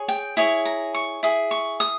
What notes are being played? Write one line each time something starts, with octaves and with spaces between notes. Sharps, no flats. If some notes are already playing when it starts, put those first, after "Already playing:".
Already playing: G#4 C#5
G5
E4 G#4 C#5
A#5
C#6
E4 G#4
C#6
D#6